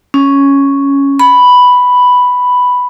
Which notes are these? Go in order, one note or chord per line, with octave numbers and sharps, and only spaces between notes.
C#4
B5